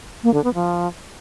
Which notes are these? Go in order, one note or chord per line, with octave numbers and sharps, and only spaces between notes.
A#3
D3
B3
F3